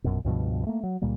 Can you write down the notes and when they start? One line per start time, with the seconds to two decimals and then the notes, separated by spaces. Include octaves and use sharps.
0.04 A#1 F#2 B2
0.25 C#2 G2 B2 F3
0.67 A3 A#3
0.84 F#3
1.02 C#2 A#2 G3 A#3